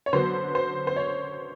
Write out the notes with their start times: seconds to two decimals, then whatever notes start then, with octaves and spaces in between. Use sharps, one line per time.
0.06 C#5
0.13 D3 F#3 B3 C5
0.55 C5
0.87 C5
0.96 C#5